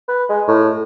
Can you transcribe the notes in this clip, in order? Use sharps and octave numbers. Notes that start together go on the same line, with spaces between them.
B4
G#3
A2